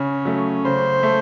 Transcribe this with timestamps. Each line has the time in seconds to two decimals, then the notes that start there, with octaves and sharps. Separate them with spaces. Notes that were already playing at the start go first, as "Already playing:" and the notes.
Already playing: C#3 C#4
0.25 F#3 A3
0.64 C#3 C5
1.03 A3